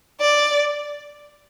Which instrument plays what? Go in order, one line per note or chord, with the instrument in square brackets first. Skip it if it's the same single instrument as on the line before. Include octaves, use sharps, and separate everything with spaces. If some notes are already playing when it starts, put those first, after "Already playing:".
[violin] D5